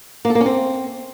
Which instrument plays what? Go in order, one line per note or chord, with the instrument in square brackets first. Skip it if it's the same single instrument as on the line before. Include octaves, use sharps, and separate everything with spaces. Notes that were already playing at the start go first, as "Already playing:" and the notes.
[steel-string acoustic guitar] A#3
A4
A#3
C#4
C4